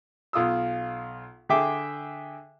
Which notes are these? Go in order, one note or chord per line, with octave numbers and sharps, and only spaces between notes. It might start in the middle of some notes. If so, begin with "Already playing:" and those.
B1 F4 D#6 E6
D3 G#4 E5 G5 D6